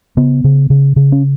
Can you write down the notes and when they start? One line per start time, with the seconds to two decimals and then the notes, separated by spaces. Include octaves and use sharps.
0.17 C#3 B3
0.44 C#3
0.70 C#3
0.96 C#3
1.12 C#4